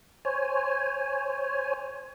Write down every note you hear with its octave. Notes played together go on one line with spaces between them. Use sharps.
C5 C#5 G#5